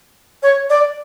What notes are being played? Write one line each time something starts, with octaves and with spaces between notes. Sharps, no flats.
C#5
D5